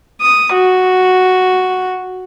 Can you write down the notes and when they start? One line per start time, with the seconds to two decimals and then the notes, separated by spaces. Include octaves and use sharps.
0.21 D#6
0.53 F#4